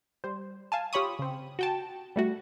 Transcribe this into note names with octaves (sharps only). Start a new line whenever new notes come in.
G3 C5
F5 G#5 A5
F4 G4 C#5 B5 C#6 D#6
C#3 C4
F#4 G5 A5
G3 A3 F#4